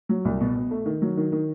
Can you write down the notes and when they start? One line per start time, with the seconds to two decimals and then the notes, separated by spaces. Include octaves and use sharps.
0.09 F#3
0.25 C2
0.41 B2
0.56 B2
0.71 A3
0.86 D#3
1.02 F#3
1.17 D#3
1.32 D#3